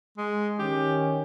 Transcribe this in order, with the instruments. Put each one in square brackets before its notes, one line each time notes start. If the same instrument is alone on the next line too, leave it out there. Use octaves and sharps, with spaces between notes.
[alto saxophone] G#3
[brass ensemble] D#3 C#4 [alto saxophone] G4